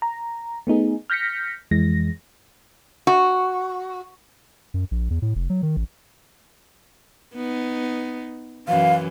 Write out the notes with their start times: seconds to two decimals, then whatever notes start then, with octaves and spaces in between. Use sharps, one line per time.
0.02 A#5
0.67 A3 B3 D#4 G#4
1.10 F6 G6 A#6 B6 C#7
1.71 F2 E3 G#3 A#6
3.07 F#4
4.74 F#2
4.91 A#1
5.10 E2
5.22 A2
5.36 F1
5.50 F#3
5.63 D#3
5.76 A1
7.34 B3 D#4
8.68 F#2 E3 F5